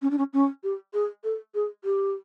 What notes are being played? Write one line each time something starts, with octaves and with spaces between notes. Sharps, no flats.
C#4
D4
C#4
C#4
G4
G#4
A4
G#4
G4